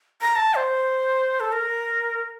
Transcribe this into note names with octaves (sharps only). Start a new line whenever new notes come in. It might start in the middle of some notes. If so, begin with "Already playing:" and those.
A#5
A5
C5
A4
A#4